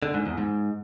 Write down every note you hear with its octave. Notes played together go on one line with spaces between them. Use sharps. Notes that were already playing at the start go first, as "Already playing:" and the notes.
D3
G#2
E2
G#2